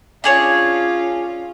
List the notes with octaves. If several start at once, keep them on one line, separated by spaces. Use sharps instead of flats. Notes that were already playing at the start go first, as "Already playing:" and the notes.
C#4 D4 F4 G#4 C#5